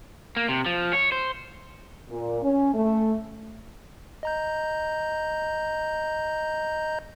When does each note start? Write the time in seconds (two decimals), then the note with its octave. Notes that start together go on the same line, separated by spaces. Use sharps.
0.36 A#3
0.49 C3
0.66 F3
0.93 C#5
1.12 C5
2.09 A#2
2.42 C#4
2.74 A3
4.23 D#5 A#5 G6